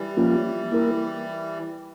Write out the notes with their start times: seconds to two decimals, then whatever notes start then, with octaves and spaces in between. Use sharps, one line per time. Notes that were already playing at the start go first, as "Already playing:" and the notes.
Already playing: E3 G3
0.17 F3 A#3 C#4 F4
0.71 A#3 E4 A#4